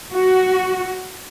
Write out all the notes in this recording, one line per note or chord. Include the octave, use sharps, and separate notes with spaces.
F#4